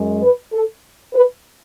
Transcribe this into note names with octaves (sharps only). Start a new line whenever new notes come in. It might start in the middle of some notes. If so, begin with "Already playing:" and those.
Already playing: F#2 G#3
B4
A4
B4